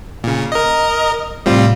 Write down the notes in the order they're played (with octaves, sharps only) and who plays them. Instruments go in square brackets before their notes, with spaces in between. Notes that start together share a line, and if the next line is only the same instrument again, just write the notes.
[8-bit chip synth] A#2 C#3
A#4 D#5
[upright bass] F1 A2 [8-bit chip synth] G3 C4 F4